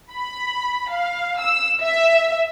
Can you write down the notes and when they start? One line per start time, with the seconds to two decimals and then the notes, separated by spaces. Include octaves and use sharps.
0.11 B5
0.91 F5
1.40 E6
1.82 E5